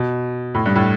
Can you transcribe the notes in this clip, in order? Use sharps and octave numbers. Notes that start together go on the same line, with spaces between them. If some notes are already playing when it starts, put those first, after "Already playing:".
Already playing: B2
A2
G2
A2